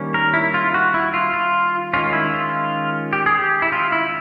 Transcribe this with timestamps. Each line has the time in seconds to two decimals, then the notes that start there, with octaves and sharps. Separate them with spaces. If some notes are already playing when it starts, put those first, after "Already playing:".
Already playing: D#3 G3 A#3 C#4
0.14 A#4
0.34 E4
0.54 F4
0.74 F#4
0.94 E4
1.14 F4
1.34 F4
1.93 D#3 G#3 C#4 F4
2.13 E4
2.34 F4
3.13 G4
3.26 G#4
3.39 G4
3.62 E4
3.72 F4
3.92 E4